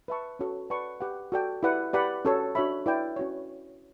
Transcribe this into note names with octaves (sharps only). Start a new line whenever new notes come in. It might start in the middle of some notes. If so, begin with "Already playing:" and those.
B4 E5 A5 C#6
C#4 F#4 A4 C#5
B4 D5 F#5 A5 C#6
G4 B4 F#5
F#4 A4 D5 G5
E4 G4 B4 D5 F#5
G4 B4 D5 F#5 B5
C#4 F#4 A4 C#5
D4 F#4 C#5 E5 B5
E4 B4 D5 G5
C#4 F#4 C#5